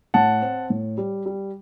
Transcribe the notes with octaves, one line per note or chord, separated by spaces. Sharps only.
A2 F#5 A5
C4
A2
G3
G3